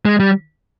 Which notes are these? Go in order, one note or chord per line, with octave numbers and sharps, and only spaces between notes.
G#3
G3